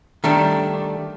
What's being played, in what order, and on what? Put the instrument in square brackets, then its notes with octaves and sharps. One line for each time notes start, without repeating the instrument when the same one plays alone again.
[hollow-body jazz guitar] D#3 G3 A3 D4